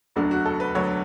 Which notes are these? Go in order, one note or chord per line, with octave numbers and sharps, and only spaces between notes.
E1 D2 D3 F#3 D4
F#4
A4
B4
E1 D2 D3 F#3 C#5